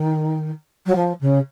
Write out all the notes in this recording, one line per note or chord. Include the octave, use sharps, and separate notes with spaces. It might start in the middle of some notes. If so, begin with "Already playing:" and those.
Already playing: D#3
F#3
F3
C#3